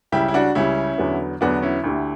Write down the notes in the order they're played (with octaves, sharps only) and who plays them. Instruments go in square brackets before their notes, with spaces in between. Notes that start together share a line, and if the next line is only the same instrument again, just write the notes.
[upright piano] C#2 C#3 G3 [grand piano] E4 G4
[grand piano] E4
D4 F#4
[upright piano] C#2 C#3 G3 [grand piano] C#4 E4
[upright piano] E2 D3 F#3 B3
[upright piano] E2 D3 F#3 B3 [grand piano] D4 F#4
[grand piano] C#4 E4
[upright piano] D2 D3 A3 E4 G4